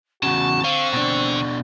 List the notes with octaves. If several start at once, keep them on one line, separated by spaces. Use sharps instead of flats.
E2 C#3 F#4 A5 C#6
D3 C4 F5
B2 D4